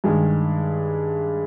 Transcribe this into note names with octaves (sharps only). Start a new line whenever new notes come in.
G2 D#3 G#3